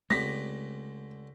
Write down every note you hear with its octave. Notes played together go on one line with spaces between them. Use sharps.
C#2 D3 G#3 A3 C4 G4 A#6 B6